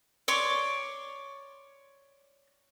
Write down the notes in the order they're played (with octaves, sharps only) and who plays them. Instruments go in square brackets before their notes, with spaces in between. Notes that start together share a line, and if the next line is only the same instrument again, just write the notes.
[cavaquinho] C#5 D5 C6 D6